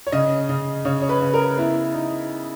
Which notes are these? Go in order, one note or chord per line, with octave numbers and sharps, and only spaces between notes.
C#5
C#3 D#5
C#3
C#3 C#5
C#5
B4
C#3
A#4
B3 E4
D#4